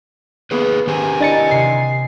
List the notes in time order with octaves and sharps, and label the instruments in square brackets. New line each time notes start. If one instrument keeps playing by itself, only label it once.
[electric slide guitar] A#3 G#4 B4 [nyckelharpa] B3
[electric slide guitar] D#3 G4 C5 [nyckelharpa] A#4 G#5
[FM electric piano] D4 A6 C#7 [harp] E4 D#5
[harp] C3 [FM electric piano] C7